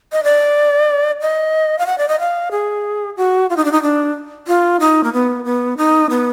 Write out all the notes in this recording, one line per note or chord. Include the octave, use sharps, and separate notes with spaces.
D#5
D5
D#5
F5
F#5
D5
D#5
F5
G#4
F#4
F4
D#4
D4
D#4
D4
F4
D#4
A#3
B3
B3
D#4
B3